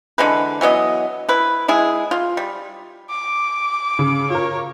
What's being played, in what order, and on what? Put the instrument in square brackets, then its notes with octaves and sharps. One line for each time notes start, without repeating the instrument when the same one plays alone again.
[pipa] D3 E3 G#3 B4
E3 F#3 B3 D#5
E4 B4
G#3 E4 G#4
F4
G3
[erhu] D6
[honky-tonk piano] C#3
[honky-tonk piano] F4 A#4 [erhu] C#5